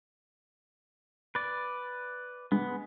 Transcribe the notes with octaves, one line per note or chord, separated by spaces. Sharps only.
B4 D5
G#3 B3